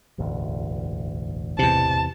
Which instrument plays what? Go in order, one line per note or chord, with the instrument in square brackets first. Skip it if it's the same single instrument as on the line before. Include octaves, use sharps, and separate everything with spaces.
[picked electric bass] E1 A1 D2
[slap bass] E2 C3 [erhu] A5